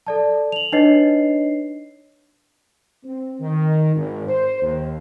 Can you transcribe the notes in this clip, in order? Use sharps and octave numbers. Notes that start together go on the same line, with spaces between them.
A4 D5 A5
F7 F#7
D4 D#4 B4 C#5 D#5 C7
C4
D#3
G#1
C5
D#2